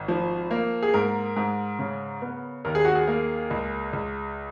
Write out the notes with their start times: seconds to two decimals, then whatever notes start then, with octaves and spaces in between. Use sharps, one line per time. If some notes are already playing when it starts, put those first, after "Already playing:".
Already playing: G#1
0.08 F3
0.51 A#3
0.82 G#4
0.94 G#2 A#4
1.36 G#2
1.79 C#3
2.22 B3
2.65 D#2 A#4
2.75 G#4
2.85 F#4
2.95 G#4
3.08 A#3
3.50 C#2
3.93 C#2